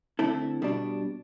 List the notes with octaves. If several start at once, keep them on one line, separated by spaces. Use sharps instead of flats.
D3 A3 C4 E4 A4
B2 G3 D4